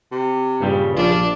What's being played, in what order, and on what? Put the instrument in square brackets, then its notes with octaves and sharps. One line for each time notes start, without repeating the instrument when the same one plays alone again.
[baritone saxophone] C3
[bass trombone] G2 [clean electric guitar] A#2 C#3 G3
[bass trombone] A#1 [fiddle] D4 [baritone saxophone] F4